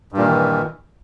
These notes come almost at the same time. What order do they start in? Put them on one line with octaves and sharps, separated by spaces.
G2 A#2 D#3 E3